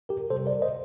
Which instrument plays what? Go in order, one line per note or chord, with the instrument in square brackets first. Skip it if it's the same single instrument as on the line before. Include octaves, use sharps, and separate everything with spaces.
[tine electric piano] G4 A#4
C3 G3 A4 C5
A#4 D5
C5 D#5